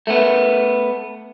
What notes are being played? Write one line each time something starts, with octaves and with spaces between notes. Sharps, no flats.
A3 B3